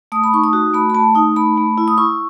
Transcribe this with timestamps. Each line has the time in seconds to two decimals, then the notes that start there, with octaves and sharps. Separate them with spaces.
0.12 A3 D#6
0.24 B5
0.34 D#4 C#6
0.44 D#6
0.53 F#4
0.74 A3 B5
0.90 B5
0.95 A3 A5
1.15 D#4 D#6
1.36 A3 B5
1.57 A3
1.78 E4
1.88 D#6
1.98 E4 C#6